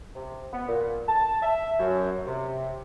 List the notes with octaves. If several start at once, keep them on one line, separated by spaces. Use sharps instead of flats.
C3
B3
A#2
A5
E5
F#2
C3